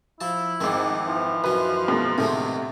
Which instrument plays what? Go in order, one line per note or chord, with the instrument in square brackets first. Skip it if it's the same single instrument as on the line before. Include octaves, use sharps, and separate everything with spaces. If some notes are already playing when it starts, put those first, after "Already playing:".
[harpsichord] F3 A5 [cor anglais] E4
[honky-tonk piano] G#1 F2 [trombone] G#2 [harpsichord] D#3 C4
[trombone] E3 [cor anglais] F3
[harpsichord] F#2 D#3 [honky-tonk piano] B4
[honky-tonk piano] B2 G#3 A#3
[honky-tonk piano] D2 C3 [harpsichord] A2 D#3 G#3 [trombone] A3